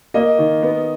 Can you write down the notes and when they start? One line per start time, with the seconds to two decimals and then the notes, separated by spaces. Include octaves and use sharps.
0.14 A#3 D#5
0.39 D#3
0.63 B3